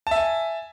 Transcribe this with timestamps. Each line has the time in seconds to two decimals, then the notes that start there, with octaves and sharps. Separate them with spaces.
0.07 A5
0.11 E5
0.16 G#5